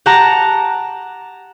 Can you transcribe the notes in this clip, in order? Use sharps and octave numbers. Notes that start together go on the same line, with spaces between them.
G4 F#5 A5 A#5